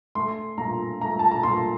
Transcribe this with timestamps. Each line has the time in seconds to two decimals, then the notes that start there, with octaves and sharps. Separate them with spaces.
0.15 A3 C6
0.58 A#2 A#5
1.01 A3 A#5
1.19 A5
1.31 A#5
1.43 A#2 C6